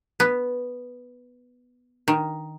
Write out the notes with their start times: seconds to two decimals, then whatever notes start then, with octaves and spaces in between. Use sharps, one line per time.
0.20 B3
2.08 D#3